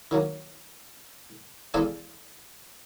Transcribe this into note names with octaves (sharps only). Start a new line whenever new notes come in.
D#3 F#3 A#3
E2 G#3 A4 D5 F5 G#5